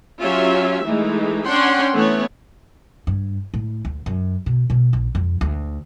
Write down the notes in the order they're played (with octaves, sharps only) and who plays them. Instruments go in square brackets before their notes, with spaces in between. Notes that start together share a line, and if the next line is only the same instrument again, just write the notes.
[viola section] F#3 C#4 F4 G4 E5
E3 G#3 A3 D#4
C#4 D4 F#5 G5 C6
E3 A3 B3 C#5
[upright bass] G2
A2
D2
F#2
B2
B2
A#1
F2
D2